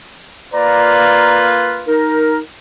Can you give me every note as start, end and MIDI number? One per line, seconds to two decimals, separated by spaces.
0.53 1.91 58
0.53 1.91 65
0.53 1.91 71
0.53 1.49 74
0.53 1.49 82
1.86 2.38 63
1.86 2.38 70